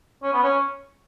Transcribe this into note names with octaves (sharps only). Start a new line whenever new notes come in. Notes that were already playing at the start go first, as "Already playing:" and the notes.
C#4
B3
C#4